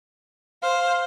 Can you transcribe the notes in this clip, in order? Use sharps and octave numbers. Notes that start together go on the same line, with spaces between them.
C5 F5